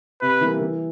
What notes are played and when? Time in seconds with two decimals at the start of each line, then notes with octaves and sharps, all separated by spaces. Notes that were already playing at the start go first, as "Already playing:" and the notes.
0.21 C3 B4
0.41 E3 G3 A#3
0.60 E3